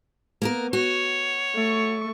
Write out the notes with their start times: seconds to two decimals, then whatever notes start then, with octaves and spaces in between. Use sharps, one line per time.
0.42 A#3 B3 A#4
0.73 F#4 C#5
1.55 A3 C#6